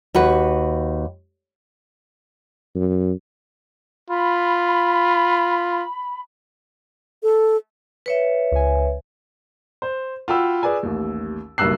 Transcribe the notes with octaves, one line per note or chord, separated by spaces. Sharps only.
D#2 F#4 B4
F#2
F4 B5
A4
B4 C#5 E5
C#2 G#5
C5
F4 F#4 G5 B5 E6
G#4 B4 D5 G#5
A1 D#2
F#1 B1 G2 E6 F#6 C7